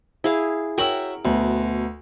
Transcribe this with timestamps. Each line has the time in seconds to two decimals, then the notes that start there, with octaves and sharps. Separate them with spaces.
0.24 E4 G#4 F5
0.78 F#4 A#4 C#5 E5 G5 F#7
1.25 D2 B2